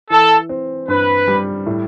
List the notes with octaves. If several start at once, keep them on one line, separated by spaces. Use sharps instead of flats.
E3 A4
C4
G2 B4
G3
A2